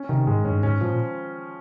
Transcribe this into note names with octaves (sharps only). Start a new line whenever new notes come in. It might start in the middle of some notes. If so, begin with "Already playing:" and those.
Already playing: C#4
C3 D#3
G#2 G#3
G2 C#4
G#2 C#4
A#2 F3